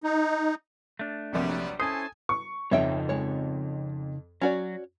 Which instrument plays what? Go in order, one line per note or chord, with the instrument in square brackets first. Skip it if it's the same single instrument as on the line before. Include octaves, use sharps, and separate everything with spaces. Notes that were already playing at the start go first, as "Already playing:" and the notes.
[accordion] D#4
[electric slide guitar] A3 D4
[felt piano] A#1 C3 [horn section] F#3 G3 B3
[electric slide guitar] C#4 E4 C5 [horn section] A4 G#5 A5 [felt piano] D#6
[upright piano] C#6
[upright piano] F2 [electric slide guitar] C#3 D#4 F4 [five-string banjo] C#5 E5 G5
[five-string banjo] G#3 C#5
[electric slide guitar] F#3 [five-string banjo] C#4 F#4 D5